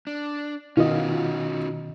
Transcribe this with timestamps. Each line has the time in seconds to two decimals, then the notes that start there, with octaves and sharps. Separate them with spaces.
0.07 D4
0.77 B2 D#3 C#4 D#4 F4 F#4 D#5